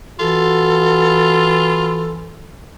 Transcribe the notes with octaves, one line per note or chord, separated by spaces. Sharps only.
E3 F4 F#4 A4